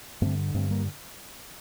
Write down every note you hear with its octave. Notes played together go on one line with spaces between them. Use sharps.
G2 D3 A3 C4
G2 D3 A3 C4
G3 A#3